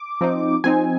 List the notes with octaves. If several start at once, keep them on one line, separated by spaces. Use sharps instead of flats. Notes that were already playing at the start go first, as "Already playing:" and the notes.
Already playing: D6
F3 C4 D#4
F3 C4 D#4 G#5